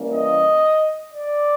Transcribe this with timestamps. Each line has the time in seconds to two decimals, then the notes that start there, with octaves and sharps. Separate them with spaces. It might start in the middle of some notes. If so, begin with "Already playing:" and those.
Already playing: E3 G3 A#3 C#4
0.13 D#5
1.14 D5